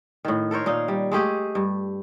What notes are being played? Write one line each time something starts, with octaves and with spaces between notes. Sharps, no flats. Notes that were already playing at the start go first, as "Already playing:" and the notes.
A2 D#3
A4 A#4 C5 C#5
A#2 D#4 F5
G3
G#3 A3 G4 G#4
G2